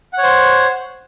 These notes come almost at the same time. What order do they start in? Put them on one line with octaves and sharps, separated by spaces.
F#5 C#5 C5